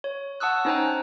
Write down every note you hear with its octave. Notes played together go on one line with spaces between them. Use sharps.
C#5
F#5 A5 C#6 D#6 E6 F#6
C#4 D#4 C5 G5 G#5 A#5